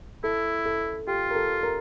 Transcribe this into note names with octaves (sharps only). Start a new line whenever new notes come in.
E4 A4
A4
F4 G4
A#4
A4
A#4